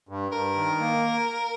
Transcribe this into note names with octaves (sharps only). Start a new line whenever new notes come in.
G2
G2 A#4
D#3
A#3